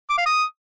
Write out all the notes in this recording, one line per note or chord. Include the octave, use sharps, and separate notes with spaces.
D6
F5
D#6